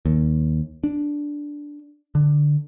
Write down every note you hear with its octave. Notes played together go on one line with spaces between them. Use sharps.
D#2
D4
D3